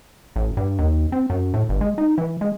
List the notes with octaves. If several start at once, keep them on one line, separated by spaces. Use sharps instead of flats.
A1
G2
D#2
C4
F#2
A2
G1
G#3
D#4
E3
G#3